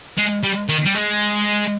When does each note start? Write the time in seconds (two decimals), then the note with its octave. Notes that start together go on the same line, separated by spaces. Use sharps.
0.18 G#3
0.43 G3
0.69 D#3
0.85 G3
0.94 G#3